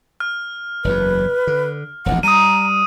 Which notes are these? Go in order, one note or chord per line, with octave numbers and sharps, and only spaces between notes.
F6
F#1 E2 B4
D3
E1 A#1 D#2 F#5
G3 A#5 D#6 D#7